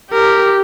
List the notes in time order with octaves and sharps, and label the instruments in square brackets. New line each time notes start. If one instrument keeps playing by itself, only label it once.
[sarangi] G4 [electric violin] A#4